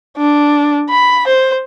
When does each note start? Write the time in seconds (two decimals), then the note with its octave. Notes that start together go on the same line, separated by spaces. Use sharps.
0.17 D4
0.89 B5
1.27 C5